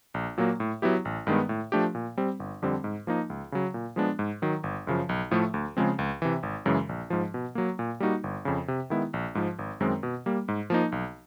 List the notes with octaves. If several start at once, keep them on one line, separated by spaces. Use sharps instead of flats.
A#1
A#2 F#3 A#3
A2
F#3 B3 E4 G4
A1
G2 D#3 G#3 B3
A2
F3 A3 D4 G4
A#2
G3 C4
G1
F2 D3 G3 C4
G#2
F3 A#3 D#4
C#2
C#3 F#3
A#2
F3 G#3 B3 D4
G#2
D#3 F#3
G1
F#2 C#3 F3
B1
A2 F3 A3
D2
C#3 F3 G#3 C4
C#2
C3 E3
G#1
F#2 C#3 E3 G#3
A#1
G#2 F3
B2
F#3 A#3
A#2
G3 A#3 D#4 F#4
G1
F2 C#3
C3
D#3 G#3 B3 E4
A#1
G#2 F3
G#1
F#2 D#3 G#3 C4
B2
G3 A#3
G#2
F3 A#3 D#4
B1